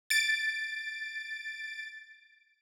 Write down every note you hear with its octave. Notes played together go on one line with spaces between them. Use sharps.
A6 D7